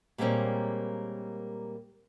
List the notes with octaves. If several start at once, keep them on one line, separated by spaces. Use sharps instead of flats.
A#2 G3 G#3 A#3 C4 C#4